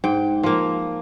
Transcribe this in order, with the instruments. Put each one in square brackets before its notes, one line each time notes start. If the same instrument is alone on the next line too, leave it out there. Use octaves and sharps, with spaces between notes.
[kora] G#2 G5
F3 A#3